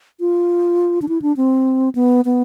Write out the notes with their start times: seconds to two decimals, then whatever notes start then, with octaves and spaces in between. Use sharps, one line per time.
0.20 F4
1.02 D4
1.09 E4
1.22 D4
1.37 C4
1.95 B3
2.25 B3